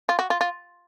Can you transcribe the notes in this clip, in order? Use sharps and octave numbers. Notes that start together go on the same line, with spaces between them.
F4
F#4
F4
F4